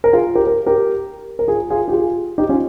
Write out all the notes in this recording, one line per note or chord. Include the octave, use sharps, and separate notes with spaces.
A#4
F4 G#4
G4 A#4
A#4
G4 A#4
A#4
F4 G#4
F4 G#4
G4
F4 G#4
D#4 G4
C#4 F4